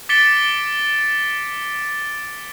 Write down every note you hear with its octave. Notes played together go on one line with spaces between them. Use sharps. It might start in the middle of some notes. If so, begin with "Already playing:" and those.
D6 A6 B6 C#7 D7 G7